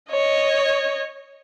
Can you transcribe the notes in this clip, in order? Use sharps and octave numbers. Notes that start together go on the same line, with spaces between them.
C#5 D#5